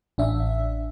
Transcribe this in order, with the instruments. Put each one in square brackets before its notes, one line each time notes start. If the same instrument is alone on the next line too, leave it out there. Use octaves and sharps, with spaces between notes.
[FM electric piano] A1 D4 E5